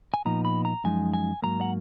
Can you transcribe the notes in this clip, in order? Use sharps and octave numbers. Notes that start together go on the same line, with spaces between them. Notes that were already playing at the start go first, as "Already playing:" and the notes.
G#5
A#2 F3 B3 D#4 A#5
B5
A#5
F#2 F3 G#3 D#4 G#5
G#5
G#2 F#3 A#3 A#5
F#5